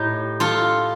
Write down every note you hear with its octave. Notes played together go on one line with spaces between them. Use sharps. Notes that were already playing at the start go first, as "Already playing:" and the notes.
Already playing: A2 D#4 G4
F4 A4